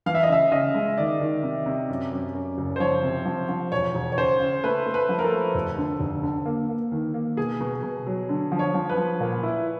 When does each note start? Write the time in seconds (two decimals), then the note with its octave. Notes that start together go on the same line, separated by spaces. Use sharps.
0.06 E3 F5
0.15 E5
0.23 D#5
0.29 C#3 E5
0.52 C#3 D#5
0.74 G#3
0.98 D#3 D5
1.20 D#3
1.43 C3
1.66 C3
1.89 F#2
2.12 F#2
2.34 F#2
2.58 F#1
2.76 C5
2.80 F3 C#5
3.03 C3
3.25 F3
3.49 F3
3.72 E1 C#5
3.95 E1
4.12 C#5
4.17 C#3 C5
4.40 C#3
4.64 A3 B4
4.86 A3
4.94 B4
5.09 F3
5.19 A#4
5.24 A4
5.32 A3
5.54 F1
5.78 D3
6.00 F1
6.23 D3
6.46 A#3
6.69 A#3
6.92 D#3
7.14 A#3
7.37 B2 G#4
7.61 B2
7.83 B2
8.06 F#3
8.29 D3
8.52 F3
8.59 C#5
8.74 F3
8.89 B4
8.97 F3
9.21 A#2
9.43 E4